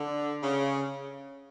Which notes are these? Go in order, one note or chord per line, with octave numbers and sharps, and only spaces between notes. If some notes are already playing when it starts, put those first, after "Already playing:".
Already playing: D3
C#3